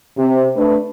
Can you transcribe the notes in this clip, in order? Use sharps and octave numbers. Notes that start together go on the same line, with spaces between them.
C3
A3 D4 B4